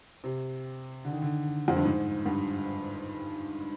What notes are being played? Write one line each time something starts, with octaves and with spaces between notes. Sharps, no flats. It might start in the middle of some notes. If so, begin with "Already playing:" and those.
C3
D3
D#3
D3
F2
G2
G#2
G2